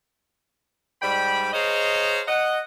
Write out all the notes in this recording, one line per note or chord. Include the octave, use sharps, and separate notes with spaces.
G#2 G3 D5 G5 B5
G#4 C5 C#5 D#5 F5 A#5
D#5 F#5